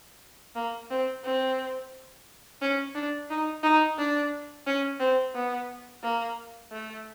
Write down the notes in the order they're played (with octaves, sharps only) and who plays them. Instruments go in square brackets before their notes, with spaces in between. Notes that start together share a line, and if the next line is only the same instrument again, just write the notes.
[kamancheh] A#3
C4
C4
C#4
D4
D#4
D#4
D4
C#4
C4
B3
A#3
A3